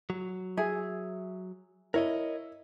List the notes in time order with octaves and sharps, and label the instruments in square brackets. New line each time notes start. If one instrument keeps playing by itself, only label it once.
[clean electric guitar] F#3
[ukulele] G#4 E5
[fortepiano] E4 [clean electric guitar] A#4 C#5 D#5